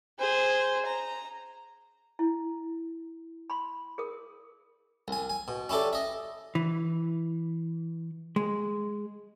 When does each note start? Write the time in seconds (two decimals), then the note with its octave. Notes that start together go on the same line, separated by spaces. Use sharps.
0.19 G#4 C5
0.85 A#5
2.19 E4
3.50 B5 C6
3.98 G#4 A#4 D#6
5.08 C2 G#5
5.30 G#5
5.48 B2
5.69 C#4 E4 G4 A4 D5
5.93 D#5 E5
6.55 E3
8.36 G#3